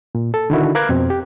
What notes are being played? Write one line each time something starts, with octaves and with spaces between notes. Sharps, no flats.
A#2
A4
D3 D#3 E4 F#4
A#4 B4 F5 D6 F#6 G#6
F2 B2 C4
G4